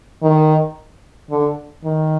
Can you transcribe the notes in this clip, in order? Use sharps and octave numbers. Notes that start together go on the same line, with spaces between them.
D#3
D3
D#3